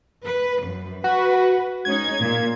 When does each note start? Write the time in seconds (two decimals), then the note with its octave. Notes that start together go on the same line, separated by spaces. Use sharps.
0.24 B4
0.61 F#2
1.04 F#4 B4
1.85 G#3 C#4 D#4 G#6
2.22 A#2